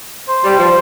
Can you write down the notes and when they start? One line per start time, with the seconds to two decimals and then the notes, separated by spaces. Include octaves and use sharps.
0.28 C5
0.44 G3
0.59 F3